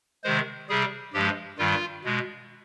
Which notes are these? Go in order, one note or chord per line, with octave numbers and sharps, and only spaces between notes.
C3 D#3 G#3 C5
C3 G3 G#4
G2 F3 G#3 G4
G2 D#3 G3 F4
B2 G#3